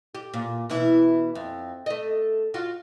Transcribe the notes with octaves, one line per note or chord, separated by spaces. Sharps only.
G4
A#2
B2 E3 E4
F2
A3 D#5
F4 F#4